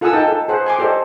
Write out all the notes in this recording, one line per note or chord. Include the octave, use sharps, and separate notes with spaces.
F4 A4 F#5 G#5 D#6 E6
D#4 A4 A#4 G5 A5
A4
G#4 C5 F#5
G#5 C6 D6
G4 A4 C5 D5 D#5